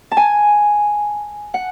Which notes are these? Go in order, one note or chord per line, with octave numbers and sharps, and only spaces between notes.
A5
G#5
F#5